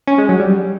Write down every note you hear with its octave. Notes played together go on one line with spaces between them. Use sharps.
C#4
G#3
F#3
G3